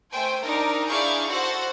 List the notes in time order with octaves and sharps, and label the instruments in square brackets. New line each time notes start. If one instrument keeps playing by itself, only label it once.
[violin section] A3 C5 G5 G#5
D4 D#4 A#4
D4 E4 G#4 F5 C#6 G6
F#4 A4 C5 F#5